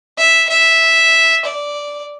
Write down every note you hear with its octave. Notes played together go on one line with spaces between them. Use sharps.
E5
E5
D5